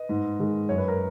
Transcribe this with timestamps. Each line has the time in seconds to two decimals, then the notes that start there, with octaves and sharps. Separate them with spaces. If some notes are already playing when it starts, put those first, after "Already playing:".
Already playing: B4 D#5
0.09 G#2
0.39 D#3 G#3
0.69 F#2 C#5
0.78 B4
0.88 A#4